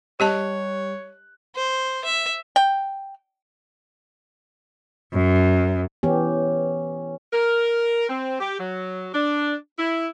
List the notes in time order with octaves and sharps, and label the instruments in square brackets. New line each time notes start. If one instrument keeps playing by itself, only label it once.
[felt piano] G3 F#6 [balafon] G4 D#5 A5 [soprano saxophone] C#5
[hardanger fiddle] C5
E5
[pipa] G5
[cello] F#2
[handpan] E3 B3 G4 [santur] C#4
[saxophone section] A#4
C4
G4
F#3
D4
E4